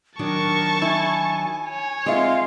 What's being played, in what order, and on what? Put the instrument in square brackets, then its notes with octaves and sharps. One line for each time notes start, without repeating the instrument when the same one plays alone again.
[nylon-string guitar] D#3 F#3 D4 [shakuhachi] A#4 [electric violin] A5 C#6
[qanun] E4 [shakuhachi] G#5
[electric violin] C#5
[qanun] G#3 F4 [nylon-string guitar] C4 E5 [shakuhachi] F5